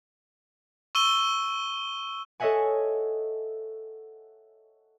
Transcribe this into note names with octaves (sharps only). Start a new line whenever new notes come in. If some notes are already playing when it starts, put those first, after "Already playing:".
C#6 E6 D#7 G7
A4 C#5 D#5 E5 F#5 G#5